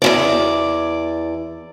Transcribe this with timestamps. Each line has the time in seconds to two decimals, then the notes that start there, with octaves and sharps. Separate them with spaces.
0.02 E2 C#3 D5